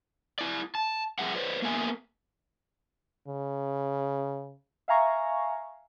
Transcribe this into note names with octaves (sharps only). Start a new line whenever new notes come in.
E4 D5
A5
F2 G3 G#4 E5 F#5
B4 C5 D5
A#3 B3 A4 A#4 E5 G#5
C#3
E5 F5 G#5 A#5 C#6